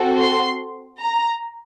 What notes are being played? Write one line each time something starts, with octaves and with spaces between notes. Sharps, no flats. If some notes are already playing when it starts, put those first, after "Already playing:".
Already playing: C4 F#4 A4
C6
A#5